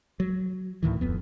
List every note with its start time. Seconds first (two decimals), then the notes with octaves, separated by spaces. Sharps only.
0.20 F#3
0.83 D2 A2 D#3 E3
1.01 D1 F2 B3